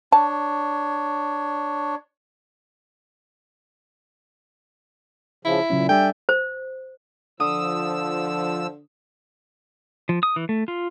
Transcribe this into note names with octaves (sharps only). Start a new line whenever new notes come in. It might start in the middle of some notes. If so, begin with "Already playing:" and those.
D4 C#5 A5
C#3 F3 E4
A#2 C#3 F#3 C#4
G3 D4 A4 D5 E5 G5 G#5
C5
D3 F3 D#6 E6
F3
D#6
E3
A3
F4